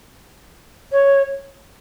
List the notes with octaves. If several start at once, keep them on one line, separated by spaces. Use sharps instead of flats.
C#5